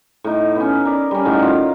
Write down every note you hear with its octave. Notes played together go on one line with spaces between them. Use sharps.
A2 D#4
B3 C#4
A#4 D5
G3 C#4
A2 D#3 F#5
F4 A#4